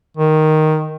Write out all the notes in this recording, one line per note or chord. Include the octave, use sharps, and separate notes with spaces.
D#3